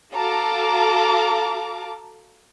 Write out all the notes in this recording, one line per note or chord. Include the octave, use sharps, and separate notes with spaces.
F#4 A4 F5 A5 A#5 D6